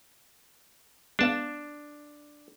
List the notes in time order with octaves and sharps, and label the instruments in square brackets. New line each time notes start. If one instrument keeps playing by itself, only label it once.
[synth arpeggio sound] G#3 B3 F5 [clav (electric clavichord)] D4 A5